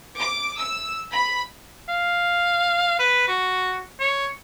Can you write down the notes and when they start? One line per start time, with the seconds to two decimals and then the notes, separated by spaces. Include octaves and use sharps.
0.18 D6
0.58 E6
1.11 B5
1.88 F5
2.99 B4
3.28 F#4
4.00 C#5